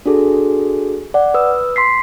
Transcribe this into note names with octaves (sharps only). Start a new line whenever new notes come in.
D4 F#4 G#4 A4
D5 F#5
B4 D#6 E6
C6 B6 C7